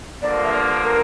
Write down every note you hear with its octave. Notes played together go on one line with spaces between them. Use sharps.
G2 D3 F3 A#3 D5
E5
D5
A#4